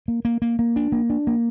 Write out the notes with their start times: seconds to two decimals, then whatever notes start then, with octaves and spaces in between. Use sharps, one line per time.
0.08 A#3
0.25 A#3
0.42 A#3
0.59 A#3
0.76 D4
0.92 A#3
1.10 D4
1.27 A#3